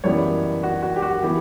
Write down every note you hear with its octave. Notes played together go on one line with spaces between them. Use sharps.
F#1 F#2 E3 G3 B3 C#5
F#4
F#4
G4
F#4
E3 B3 G4